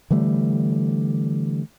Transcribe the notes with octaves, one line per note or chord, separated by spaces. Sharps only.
D3 E3 G3 A3